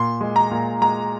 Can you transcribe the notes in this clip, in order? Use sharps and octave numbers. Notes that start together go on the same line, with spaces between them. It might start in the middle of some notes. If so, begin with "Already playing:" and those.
Already playing: A#2 C6
G#3
A#5
A#2
G#3 A#5